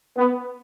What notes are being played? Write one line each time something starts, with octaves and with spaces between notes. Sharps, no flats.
B3